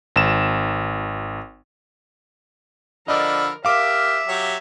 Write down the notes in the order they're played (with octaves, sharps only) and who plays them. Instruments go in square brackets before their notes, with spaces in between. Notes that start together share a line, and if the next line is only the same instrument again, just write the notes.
[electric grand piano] G#1 E7
[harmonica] D3 F3 B5 [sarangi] A#4 [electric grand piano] D5 D#5
[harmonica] G4 A#4 [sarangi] E5 [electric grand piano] F5 D6
[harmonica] F#3 G4 C#5